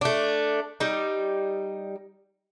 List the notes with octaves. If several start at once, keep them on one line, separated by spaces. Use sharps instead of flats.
A3 D4
G3 D#4